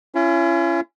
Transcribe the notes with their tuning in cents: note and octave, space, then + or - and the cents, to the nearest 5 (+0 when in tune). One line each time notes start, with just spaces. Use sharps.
C#4 +0 E4 +45